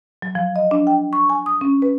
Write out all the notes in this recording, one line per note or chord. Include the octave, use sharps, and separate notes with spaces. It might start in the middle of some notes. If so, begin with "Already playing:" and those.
F#3
F3
D#5
D4
G5
C#6
G#5
D#6
C#4
B4